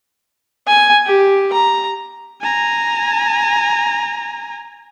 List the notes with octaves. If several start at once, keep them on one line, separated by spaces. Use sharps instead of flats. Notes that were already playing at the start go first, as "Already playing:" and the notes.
G#5
G4
A#5
G#5 A#5